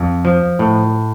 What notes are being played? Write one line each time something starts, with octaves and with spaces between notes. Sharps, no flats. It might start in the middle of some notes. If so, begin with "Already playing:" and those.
Already playing: F2
F3
A2